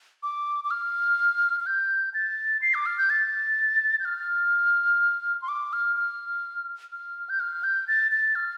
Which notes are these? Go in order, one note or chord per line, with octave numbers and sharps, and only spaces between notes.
D6
D6
F6
F6
G6
A6
C7
D6
F6
G6
A6
G6
F6
C6
D6
F6
F6
F6
G6
F6
G6
A6
A6
F6